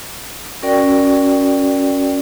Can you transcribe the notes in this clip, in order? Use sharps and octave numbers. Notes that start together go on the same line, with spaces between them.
C#4 F#4 A#4 D5 G5